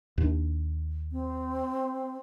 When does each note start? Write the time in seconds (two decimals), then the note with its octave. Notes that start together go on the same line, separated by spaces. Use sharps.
0.18 D#2 D4
1.12 C4